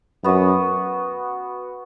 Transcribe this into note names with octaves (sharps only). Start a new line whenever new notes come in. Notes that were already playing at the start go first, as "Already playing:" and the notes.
F#2 B3 F#4 B4